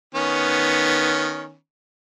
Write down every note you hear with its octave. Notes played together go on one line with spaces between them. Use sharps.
D#3 B3 C#4